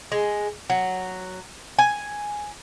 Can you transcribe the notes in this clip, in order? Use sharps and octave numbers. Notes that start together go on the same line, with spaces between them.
G#3
F#3
G#5